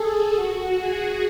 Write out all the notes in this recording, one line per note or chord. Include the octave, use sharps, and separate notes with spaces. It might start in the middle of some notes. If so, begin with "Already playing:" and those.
Already playing: G#4 A4
F#4
G#4